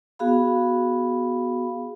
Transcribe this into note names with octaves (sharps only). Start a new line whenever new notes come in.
B3 F#4 G#4 F5 B5